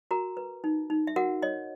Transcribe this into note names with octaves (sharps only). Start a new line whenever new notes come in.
F#4 A#4 A#5
B4
D#4
D#4
E5
F#4 A#4 F#5
C#5 D#5